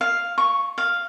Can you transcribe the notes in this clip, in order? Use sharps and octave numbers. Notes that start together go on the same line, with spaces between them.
F5
C#6
F5